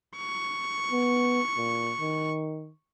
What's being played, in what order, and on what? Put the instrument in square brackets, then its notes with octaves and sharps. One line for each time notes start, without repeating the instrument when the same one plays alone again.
[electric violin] C#6
[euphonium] B3
A#2
D#3